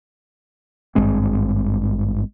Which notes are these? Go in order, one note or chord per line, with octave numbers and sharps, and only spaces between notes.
G#1 G2 G#3 C4